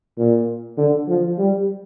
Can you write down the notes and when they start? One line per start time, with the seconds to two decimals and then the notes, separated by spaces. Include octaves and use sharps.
0.18 A#2
0.78 D3
1.08 F3
1.38 G3